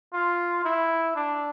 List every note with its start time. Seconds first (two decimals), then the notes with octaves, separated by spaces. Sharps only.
0.13 F4
0.65 E4
1.16 D4